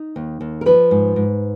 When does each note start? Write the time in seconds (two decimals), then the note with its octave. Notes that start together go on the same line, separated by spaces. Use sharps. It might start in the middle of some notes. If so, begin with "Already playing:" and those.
Already playing: D#4
0.16 D#2
0.41 D#2
0.61 A#4
0.66 F3 B4
0.91 G#2
1.16 G#2